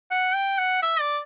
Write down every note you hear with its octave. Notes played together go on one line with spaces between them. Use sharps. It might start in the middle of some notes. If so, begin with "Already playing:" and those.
F#5
G5
F#5
E5
D5